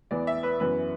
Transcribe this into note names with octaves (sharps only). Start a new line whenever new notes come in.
E2 E3 B3 D5
E5
B4
F#2 E3 B3 B4